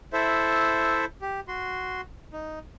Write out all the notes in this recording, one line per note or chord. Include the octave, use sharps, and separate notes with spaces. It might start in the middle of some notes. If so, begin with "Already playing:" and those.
E4 A4 C5 E5
G4
F#4 C6
D#4